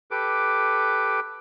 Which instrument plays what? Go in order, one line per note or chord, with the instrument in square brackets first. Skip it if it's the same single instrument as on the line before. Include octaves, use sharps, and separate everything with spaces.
[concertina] G4 A4 B4 D6